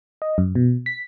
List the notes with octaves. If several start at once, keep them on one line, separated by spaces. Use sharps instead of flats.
D#5
F#2
B2
B6